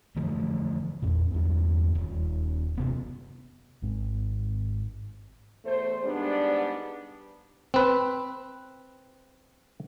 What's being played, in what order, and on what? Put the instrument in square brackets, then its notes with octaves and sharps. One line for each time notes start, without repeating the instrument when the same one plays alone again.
[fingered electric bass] D3 E3 F3 A3
E2 A#2
E2 G2
D#1
F#1 C3 B3
G#1 G#2 G#3 C4
[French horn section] E2 A3 C5
G#2 G3 B3 D4
[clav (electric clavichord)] C4 B4